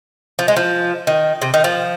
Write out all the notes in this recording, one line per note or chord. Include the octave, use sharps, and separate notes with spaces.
F3
G#3
F3
D#3
C3
D#3
F3